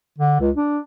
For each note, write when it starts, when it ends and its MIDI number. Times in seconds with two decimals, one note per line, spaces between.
0.18 0.36 50
0.40 0.50 37
0.57 0.80 62